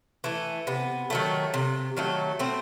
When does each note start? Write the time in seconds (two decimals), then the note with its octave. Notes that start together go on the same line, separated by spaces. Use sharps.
0.24 E3 A3
0.67 C3 B3
1.10 D#3 F#3 A3
1.54 C3
1.97 D#3 F#3 A3
2.39 B2 A3 C4